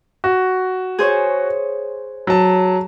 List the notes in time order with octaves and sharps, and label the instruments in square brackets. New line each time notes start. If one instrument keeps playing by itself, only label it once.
[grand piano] F#4
[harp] G#4 C5 C#5
[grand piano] F#3 A5